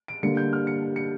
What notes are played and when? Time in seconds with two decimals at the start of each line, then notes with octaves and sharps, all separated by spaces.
0.08 D7
0.23 D3 G3 A#3 C#7
0.37 G6
0.53 F6
0.67 C#7
0.96 C#7